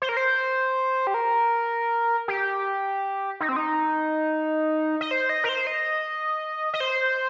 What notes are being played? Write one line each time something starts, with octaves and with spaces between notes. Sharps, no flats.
C5
A#4
C5
G4
A#4
G4
D#4
C4
D#4
D#5
C5
D#5
A#4
C5
D#5
D#5
C5